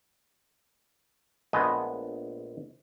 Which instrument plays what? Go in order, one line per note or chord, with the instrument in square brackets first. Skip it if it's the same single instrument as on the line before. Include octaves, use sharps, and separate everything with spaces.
[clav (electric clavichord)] A#1 G#3 A3 B3 D#5 G#5